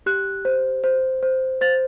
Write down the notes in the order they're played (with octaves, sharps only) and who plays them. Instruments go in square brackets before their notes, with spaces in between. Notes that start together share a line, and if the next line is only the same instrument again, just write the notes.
[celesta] G4 F#6
C5
C5
C5
C5 A6